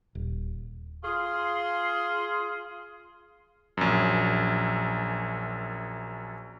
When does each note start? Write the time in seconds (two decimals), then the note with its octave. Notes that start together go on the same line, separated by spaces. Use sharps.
0.15 D#1
1.03 F4 G#4 C6
3.77 A#1 F#2